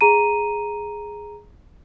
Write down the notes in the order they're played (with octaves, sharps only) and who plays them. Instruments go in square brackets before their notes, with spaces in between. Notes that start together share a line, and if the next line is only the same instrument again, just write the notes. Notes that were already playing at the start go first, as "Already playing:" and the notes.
[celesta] G#4 A#5 D#7